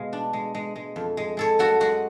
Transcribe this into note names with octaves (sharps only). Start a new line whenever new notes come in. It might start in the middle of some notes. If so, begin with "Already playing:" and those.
Already playing: B2 G#3 F5
D4
G#3
G#3
G#3
F2
G#3
G#3 A4 C#5
F#2 F#4 A4
G#3 F#4